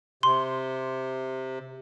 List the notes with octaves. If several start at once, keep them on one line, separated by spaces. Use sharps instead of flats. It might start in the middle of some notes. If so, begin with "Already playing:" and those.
C3 C6